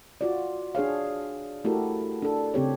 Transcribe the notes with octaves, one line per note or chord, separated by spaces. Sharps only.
F4 F#4 D5
D4 G#4 C#5 F5
A3 E4 F#4 G4 A4 A#4
D4 A4
C#3 C4 G4 C#5